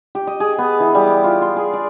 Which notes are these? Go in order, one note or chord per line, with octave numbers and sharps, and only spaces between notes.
G4
D#5
G#4
B3
E3
G3
D6
F4
C6
G#4
D5